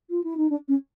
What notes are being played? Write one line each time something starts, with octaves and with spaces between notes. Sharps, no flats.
F4
E4
D#4
D4
C#4